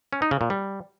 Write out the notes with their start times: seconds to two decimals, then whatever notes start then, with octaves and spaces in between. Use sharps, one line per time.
0.13 C#4
0.22 D#4
0.31 C#3
0.41 A#2
0.50 G3